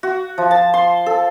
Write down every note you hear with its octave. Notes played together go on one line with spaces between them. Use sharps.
F#4
F3
A5
C6
A4